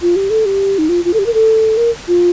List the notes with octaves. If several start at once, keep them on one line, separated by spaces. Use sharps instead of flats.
F4
G4
A4
G4
D#4
F4
F4
A4
G4
A#4
A4
A#4
F4